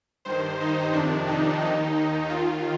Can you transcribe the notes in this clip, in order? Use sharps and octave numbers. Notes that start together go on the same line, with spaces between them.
G2 D#3 C5
D#4
F2 C3 D#3 D4
D#4
D#2 D#3 D#4
D#2 D#3 F4